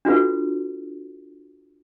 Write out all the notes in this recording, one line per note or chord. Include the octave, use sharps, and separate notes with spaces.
D4 F4 F#4 A4 B4